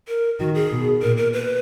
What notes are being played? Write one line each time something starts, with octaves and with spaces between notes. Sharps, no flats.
A#4
D#3 F#4
G#4
B2
A#2 A#4
A#4
B4